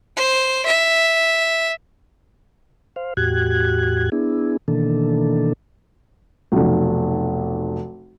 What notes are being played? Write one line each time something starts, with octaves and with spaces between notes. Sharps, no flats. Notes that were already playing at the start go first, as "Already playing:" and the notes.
C5
E5
C5 F5
E2 A2 F#4 G4 F#6 G#6
B3 D4 E4 G#4
B2 D#3 E3 A#3 D4 A4
F1 B1